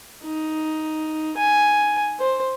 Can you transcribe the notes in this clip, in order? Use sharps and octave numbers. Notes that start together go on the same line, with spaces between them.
D#4
G#5
C5